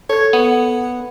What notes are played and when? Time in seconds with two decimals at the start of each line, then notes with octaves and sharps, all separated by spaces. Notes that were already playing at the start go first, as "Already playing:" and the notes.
0.10 A4 C#5 G#6
0.33 B3 F#5